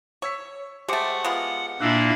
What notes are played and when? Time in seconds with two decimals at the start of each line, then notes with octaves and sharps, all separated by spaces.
0.22 C#5 C#6 E6 B6
0.88 G#3 A3 G4 C5 F#5 D6
1.24 G#3 B3 F4
1.81 A#2 A#3 D4 E4 E6 F#6